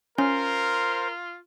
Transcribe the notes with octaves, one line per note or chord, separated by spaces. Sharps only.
C#4 F4 A#4 C5